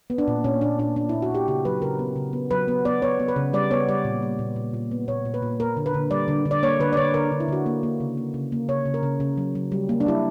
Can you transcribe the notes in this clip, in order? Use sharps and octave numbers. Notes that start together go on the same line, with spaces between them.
B3
D4
A#2
A#2 C#4
A#2 D4
A#2 D4
A#2 D4
A#2 E4
F#4
A#2 G4
C#3 G4
F#3 B4
C#3 A#4
B3
C#3
B3
F#3 B4
B3
B3 D5
B3 C#5
B3
B4
C#3
G3 D5
B3 C#5
G3 D5
A#2
G3
A#2
A#2
A#2
B3
A#2 C#5
A#2
B4
A#2
A#3 A#4
D3
B4
D3
G3 D5
D3
D3
D5
A#3 C#5
D3 B4
D5
D3 C#5
D3 A#4
D3
E4
D3 F#4
A#3
A#3
C#3
A#3
C#3
A#3
C#3 C#5
C#3
A#4
C#3
C#3
F#3
F#3
G3
A#3
D4
G3 E4